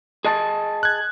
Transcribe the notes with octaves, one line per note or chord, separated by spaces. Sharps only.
G#4 D#5 A5
F#6 G#6